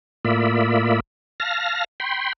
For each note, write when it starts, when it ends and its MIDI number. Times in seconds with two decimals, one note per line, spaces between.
0.25 1.00 45
0.25 1.00 58
0.25 1.00 65
0.25 1.00 74
0.25 1.00 76
0.25 1.00 83
1.40 1.84 77
1.40 1.84 81
1.40 1.84 89
1.40 1.84 94
2.00 2.33 79
2.00 2.33 83
2.00 2.33 84